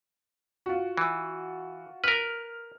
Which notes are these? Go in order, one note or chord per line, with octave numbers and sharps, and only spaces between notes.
F4 F#4
E3
A#4 B4 F6